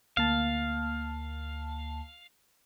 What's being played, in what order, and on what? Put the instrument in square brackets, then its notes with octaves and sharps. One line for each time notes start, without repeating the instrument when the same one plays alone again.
[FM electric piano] D2 A#3 A5 [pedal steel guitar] F5